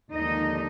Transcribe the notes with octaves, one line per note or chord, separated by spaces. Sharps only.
D#2 D3 F3 G#3 D#4 D#5